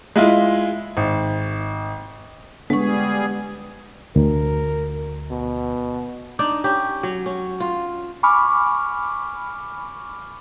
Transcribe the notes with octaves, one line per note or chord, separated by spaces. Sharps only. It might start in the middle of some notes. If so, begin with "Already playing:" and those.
G#3 E4 F4
G#1
D3 G3 G#3 B3 G#4 C#6
D2 A#4
B2
D4 D#4 D5
C#4 G4
F#3
C#4
F4
G#5 B5 C#6 D6 F6